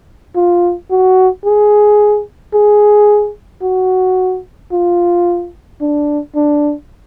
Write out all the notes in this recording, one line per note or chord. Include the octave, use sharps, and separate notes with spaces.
F4
F#4
G#4
G#4
F#4
F4
D4
D4